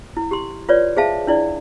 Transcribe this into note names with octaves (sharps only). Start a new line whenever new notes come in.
E4
G4 C6
F4 B4 C#5 D5
G#4 C5 E5 F5 A5
D4 E4 D5